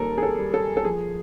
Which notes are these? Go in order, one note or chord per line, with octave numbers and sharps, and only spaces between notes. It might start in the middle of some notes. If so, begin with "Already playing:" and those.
Already playing: D#2 G3 A4 A#4
G#4
A4
G3
A4
A4
F3 G#4